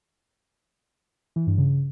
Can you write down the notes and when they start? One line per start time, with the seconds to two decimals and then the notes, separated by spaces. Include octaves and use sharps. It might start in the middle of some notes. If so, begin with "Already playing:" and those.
1.36 E3
1.47 G2
1.58 C#3